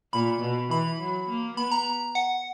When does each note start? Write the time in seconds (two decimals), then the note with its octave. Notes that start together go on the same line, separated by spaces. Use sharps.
0.13 A#2 B5
0.41 B2
0.71 E3 B5
1.00 F#3
1.29 A#3
1.57 B3 B5
1.71 A#5
2.15 F#5